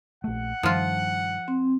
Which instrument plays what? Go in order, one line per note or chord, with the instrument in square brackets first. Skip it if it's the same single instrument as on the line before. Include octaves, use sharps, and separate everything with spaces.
[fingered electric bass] A#1 A3 [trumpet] F#5
[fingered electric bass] G2 D#3 [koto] F3 F4
[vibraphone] C4